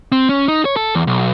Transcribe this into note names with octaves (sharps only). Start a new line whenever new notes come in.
C4
C#4
D#4
C#5
A4
E2
B1